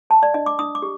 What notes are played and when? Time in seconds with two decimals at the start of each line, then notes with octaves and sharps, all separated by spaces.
0.10 C5 A5
0.23 D5
0.34 D4 D#5
0.46 D6
0.59 D4 D#6
0.75 D6
0.82 G4